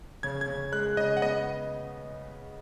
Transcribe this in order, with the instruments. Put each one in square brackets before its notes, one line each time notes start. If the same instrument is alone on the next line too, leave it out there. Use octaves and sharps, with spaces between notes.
[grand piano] C#3 [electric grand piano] G#6
[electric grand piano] G#6
[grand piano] C#3
[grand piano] G#3 [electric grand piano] F#6
[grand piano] C#3 [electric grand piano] D#5
[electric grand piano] F#5
[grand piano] B3 [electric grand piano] D#5